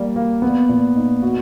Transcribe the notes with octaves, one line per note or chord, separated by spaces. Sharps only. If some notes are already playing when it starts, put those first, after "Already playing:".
Already playing: G3 A#3
A#3
B3
A#2
D#4
F#4